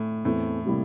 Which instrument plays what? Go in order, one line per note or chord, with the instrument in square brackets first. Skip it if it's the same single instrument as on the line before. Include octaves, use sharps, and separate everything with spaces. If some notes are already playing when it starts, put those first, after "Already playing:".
Already playing: [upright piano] A2
[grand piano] E2 E3 A3 C4 [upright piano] A2
[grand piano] C3 G3 A#3 E4